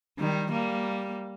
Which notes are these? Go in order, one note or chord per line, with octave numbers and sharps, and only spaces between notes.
D#3 G3
G3 A#3